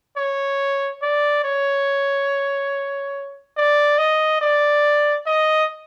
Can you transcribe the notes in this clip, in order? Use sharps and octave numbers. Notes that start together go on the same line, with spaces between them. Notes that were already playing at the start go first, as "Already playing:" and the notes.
C#5
D5
C#5
D5
D#5
D5
D#5